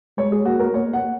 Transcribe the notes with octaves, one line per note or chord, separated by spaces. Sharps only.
G#3 C#5
G#4
A#3 F#4
A#4
A#3 C#5
F#5